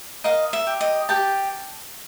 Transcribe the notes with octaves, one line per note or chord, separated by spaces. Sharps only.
A#4 D#5 F5
E5
G4
D#5
G4 G5 A5